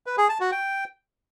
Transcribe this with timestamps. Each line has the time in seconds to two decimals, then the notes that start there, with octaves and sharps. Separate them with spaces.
0.06 B4
0.18 G#4
0.29 A5
0.40 F#4
0.52 G5